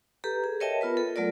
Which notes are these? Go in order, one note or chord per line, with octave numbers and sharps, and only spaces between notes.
G4 A4 B4 A#5
G#4
A#4 C#5 D#5 E5 G5 A5
B3 F4 A#4 B4
A4
F#3 A3 F4 A#4 D5